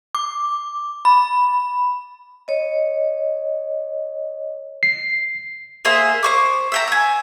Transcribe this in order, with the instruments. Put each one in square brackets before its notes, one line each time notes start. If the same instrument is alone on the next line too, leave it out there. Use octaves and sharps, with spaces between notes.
[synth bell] D6
B5
[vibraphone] C#5 D#5
[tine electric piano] C7
[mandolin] A#3 G#4 C5 E5
C5 C#6 D6
E5 G5 A#5
G#5 E6